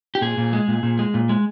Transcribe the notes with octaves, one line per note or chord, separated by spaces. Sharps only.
G4
A#2 G#4
A#2
G#3
A#2
A#2
G#3
A#2
G#3